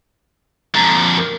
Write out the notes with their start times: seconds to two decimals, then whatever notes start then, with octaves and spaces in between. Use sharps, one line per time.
0.75 F2 D3 A#5
1.17 A#4